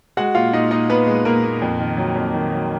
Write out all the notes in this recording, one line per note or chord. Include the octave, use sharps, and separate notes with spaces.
G#3 F#4 F#5
A#2 F4 F5
A#2 D#4 D#5
A#2 D#4 D#5
A#2 B3 B4
G#3
A#2 A#3 A#4
A#2
F2
D#3
F#3
F2
D#3
F#3